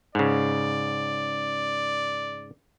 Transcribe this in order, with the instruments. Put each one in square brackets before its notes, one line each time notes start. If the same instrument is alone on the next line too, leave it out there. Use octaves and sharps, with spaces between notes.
[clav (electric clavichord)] G#2 C#3 [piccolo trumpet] D5